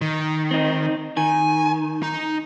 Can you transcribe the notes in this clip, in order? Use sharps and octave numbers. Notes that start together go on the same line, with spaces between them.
D#3
C4 D#4
D#3 G#5
D#4